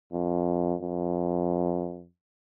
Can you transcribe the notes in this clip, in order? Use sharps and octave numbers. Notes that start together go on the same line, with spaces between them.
F2
F2